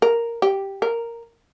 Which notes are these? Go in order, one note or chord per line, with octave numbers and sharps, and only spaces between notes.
A#4
G4
A#4